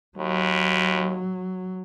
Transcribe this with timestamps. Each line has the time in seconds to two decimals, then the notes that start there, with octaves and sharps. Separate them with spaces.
0.18 D#2 F#3